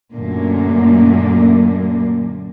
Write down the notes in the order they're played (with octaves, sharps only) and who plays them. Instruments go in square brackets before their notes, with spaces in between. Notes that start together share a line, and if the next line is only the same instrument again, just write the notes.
[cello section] F#2 A#2 D3 A3 A#3